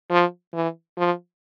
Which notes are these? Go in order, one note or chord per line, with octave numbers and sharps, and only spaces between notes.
F3
E3
F3